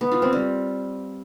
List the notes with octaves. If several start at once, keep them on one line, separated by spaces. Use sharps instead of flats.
B3
F4
C4
G3